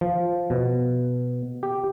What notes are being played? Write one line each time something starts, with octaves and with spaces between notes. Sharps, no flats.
F3
B2
G4